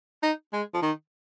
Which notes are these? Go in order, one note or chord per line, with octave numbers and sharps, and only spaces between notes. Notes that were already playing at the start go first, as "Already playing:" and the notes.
D#4
G#3
F3
D#3